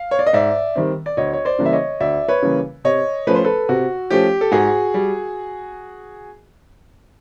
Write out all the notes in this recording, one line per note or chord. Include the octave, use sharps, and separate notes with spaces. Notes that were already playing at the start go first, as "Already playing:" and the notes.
Already playing: F5
C#5
D5
D#5
G#2 D5 E5
D#3 G3 C4
D5
D2 C#5 D#5
C#5
C5 D5
C#3 E3 G3 A#3
E5
C#5 D#5
D2 D5 E5
B4 C#5
C#3 E3 G3 A#3
C3 C#5 D#5
F3 A3 C#4 B4
C5
A4 B4
C3 F#4
F3 A3 C#4 G4
A4
G#2 F#4 G#4
G3